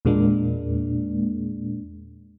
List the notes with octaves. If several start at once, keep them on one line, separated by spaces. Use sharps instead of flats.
E2 A#2 G#3 A#3 D4